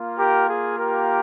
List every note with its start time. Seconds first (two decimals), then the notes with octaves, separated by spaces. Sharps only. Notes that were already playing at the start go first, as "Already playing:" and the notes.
Already playing: A#3 F4
0.18 G4 A#4
0.48 G#4
0.78 G4 A#4